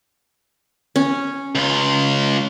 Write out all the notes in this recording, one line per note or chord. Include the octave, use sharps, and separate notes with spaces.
C#4
C#2 F4